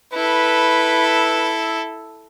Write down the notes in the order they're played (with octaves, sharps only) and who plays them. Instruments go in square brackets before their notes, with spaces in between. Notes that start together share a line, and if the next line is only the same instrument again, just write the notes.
[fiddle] E4 A4 [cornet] B4